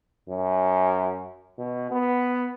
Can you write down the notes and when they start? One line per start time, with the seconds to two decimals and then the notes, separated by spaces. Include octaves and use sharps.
0.29 F#2
1.58 B2
1.91 B3